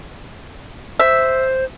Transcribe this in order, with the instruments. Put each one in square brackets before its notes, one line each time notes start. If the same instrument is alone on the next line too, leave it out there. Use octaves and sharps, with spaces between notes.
[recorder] C5 [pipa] E5